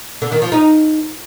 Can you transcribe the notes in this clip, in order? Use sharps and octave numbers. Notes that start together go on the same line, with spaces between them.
D3
D#3
F3
D#4